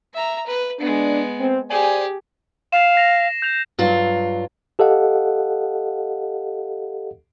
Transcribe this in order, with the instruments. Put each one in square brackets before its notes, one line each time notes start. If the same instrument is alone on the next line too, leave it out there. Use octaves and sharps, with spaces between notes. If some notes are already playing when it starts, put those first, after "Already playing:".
[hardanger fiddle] E5 A#5
B4
[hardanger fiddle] G#3 B3 [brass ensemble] D4
[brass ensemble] C4
[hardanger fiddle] G4 G#4 [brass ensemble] C5 D5 G#5
[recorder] F5 [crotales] C7 E7
[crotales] A#6 F7
G6 F7
[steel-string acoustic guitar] G2 F#3 F4
[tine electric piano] G4 A4 D#5 F5 F#5